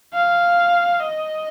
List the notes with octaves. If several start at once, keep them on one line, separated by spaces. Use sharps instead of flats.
F5
D#5